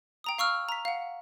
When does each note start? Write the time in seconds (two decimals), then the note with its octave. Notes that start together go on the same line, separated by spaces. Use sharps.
0.24 G5 A#5 D#6
0.38 F5 C#6 E6 F6
0.69 A#5 B6
0.85 F5 F#5